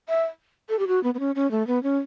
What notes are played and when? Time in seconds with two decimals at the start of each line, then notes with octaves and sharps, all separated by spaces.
0.09 E5
0.69 A4
0.79 G4
0.87 F#4
1.04 B3
1.14 B3
1.20 C#4
1.35 C#4
1.51 A3
1.67 B3
1.83 C#4